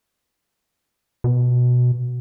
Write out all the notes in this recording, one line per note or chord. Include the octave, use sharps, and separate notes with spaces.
B2